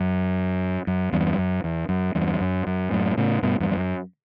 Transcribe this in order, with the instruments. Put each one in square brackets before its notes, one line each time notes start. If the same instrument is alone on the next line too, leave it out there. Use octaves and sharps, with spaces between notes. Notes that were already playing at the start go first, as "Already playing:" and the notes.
Already playing: [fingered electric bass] F#2
F#2
E2 G2
F#2
E2
F#2
E2 G2
F#2
F#2
F#2 A2
A2 C#3
G2 B2
E2 G2
E2
F#2